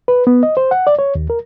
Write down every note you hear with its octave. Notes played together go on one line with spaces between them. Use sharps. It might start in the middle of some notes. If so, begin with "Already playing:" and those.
B4
B3
D#5
C5
F#5
D5
C#5
D#2
A#4